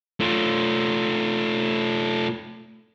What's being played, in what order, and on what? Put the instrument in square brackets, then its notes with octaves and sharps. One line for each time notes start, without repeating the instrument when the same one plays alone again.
[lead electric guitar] A3 F4